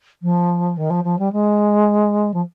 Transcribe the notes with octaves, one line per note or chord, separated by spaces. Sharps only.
F3
D#3
F3
F3
G3
G#3
F3